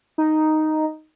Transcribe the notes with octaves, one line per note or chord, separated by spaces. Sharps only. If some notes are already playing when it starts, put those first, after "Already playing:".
D#4